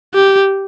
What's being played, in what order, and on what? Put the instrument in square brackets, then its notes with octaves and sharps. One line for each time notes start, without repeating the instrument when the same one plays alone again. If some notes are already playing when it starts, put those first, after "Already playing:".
[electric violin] G4